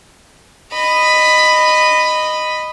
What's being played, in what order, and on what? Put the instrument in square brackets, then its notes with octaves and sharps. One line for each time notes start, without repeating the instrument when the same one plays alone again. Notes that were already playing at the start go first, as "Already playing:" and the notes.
[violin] D#5 B5